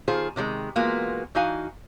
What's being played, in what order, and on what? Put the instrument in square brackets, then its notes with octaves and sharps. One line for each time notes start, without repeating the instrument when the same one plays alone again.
[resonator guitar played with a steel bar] D#3 F4 G#4 C5
C3 D#3 F#3 G#3
E3 G#3 A#3 B3 F4 F#4
E3 D#4 F#4 F5 G#5